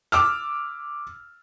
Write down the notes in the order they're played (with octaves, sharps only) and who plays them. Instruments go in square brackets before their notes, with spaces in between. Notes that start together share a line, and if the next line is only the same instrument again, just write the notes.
[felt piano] D6 E6 F6